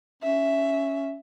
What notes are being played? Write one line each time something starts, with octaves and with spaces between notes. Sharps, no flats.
C#4 E5